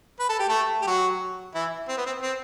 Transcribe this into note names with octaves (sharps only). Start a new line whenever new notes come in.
B4
A4
G4
A3 A4
G4
F#3 F#4
E3 E4
C4
B3
C4
C4